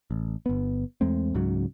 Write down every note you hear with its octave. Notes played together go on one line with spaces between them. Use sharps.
A1
G1 B3
E2 G#3 A3 C4
C#2 G#2 C#3 F#3